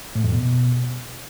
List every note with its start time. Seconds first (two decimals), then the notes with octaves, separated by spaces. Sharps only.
0.15 A2
0.24 F2
0.33 B2